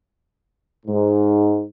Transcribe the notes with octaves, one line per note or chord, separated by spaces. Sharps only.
G#2